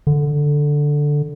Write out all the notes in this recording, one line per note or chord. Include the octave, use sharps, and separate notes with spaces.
D3